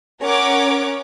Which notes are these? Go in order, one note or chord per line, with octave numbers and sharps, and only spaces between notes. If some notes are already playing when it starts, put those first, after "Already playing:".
C#4 A#4 C#5 F#5 D6